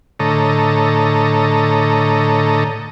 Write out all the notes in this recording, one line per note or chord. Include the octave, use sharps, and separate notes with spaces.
A2 D3 A4 C#5 D#5 A#5